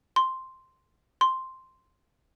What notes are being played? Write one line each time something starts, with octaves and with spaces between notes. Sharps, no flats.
C6
C6